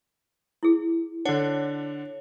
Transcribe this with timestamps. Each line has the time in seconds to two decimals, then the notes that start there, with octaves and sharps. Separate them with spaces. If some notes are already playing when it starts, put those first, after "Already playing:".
0.63 E4 G#4
1.25 D3 D4 C#5 F#5